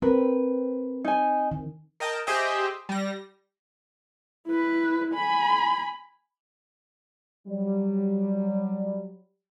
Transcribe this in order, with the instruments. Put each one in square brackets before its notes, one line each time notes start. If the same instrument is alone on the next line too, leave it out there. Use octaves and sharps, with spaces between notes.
[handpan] C4 [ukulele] A#4 B4
[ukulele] D#4 G#5
[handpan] D#3
[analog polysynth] A#4 D#5 G5 A5
G4 G#4 C5 D#5 E5 G5
G3 A#6
[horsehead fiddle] E4 B4
G#5 B5
[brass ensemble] F#3 G3